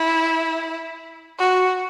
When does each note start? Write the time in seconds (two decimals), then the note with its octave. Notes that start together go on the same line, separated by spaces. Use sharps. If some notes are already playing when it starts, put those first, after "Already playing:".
Already playing: E4
1.39 F#4